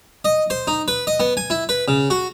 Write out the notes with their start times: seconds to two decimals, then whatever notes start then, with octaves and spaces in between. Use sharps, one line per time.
0.25 D#5
0.50 C5
0.67 D#4
0.88 B4
1.07 D#5
1.20 B3
1.37 G#5
1.50 E4
1.69 B4
1.88 C#3
2.10 F#4